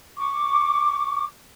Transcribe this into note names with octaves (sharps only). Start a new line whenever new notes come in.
C#6 D6